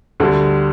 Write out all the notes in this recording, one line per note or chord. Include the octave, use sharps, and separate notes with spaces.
D2 D3 G3